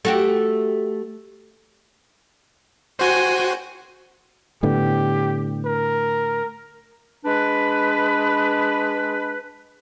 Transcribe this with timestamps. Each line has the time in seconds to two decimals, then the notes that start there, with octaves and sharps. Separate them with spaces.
0.05 A3 F#4 G4
2.99 F#4 C5 G5 G#5
4.63 A2 D3 B3 G4
5.65 A#4
7.25 G#3 D4 B4